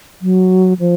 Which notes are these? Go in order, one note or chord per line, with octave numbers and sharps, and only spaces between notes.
F#3
F3